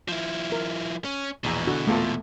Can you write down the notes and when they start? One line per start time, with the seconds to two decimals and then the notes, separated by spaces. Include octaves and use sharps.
0.08 F3 E4
0.52 A#4
1.05 C#4
1.44 A#1 E2 B2 E3 A#5
1.67 D3 F#4
1.87 E2 A#2 A3 B3 F4 A4